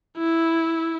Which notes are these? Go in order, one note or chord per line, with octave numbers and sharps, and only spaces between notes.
E4